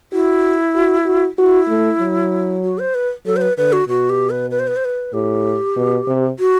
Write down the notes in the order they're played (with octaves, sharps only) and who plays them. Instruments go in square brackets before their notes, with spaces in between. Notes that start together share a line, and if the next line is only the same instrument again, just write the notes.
[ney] E4 [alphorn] F#4
[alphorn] F#4
F#4
[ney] E4 [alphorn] F#4
[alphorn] A3
F#3
[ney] F#4
C5
B4
[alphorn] F#3 [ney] A4
[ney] C5
B4
[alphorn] D3 [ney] B4
[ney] F#4
[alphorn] B2 [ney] F#4
[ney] G4
B4
B4
C5
B4
C5
B4
[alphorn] A2 [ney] G4
[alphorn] B2
C3
[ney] F#4